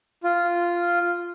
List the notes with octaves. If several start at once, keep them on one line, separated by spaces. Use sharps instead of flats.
F4